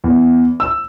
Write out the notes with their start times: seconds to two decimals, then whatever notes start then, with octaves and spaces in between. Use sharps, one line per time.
0.04 E2
0.60 E6